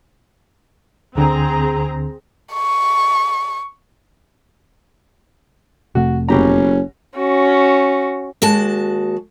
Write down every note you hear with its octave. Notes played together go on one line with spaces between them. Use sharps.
D2 D3 C4 G#4 A#5
C#6
F1 C3 A3 F#4
F#1 B2 C#4 G4 A#5
C#4 F#4
D#2 G#3 F#4 A5